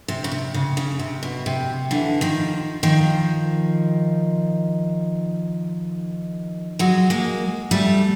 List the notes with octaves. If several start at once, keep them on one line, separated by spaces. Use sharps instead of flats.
C3
C#3
C3
C#3
C#3
C3
B2
C3
D3 E3
D#3 F3
D#3 F3
F#3 G#3
G#3 A#3
G3 A3